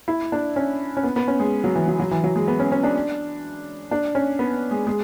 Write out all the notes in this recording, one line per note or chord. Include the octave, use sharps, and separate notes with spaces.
E4
D4
C#4
C#4
B3
B3
C#4
G#3
F#3
E3
F#3
F#3
E3
F#3
G#3
B3
C#4
C#4
D4
D4
C#4
B3
G#3
G#3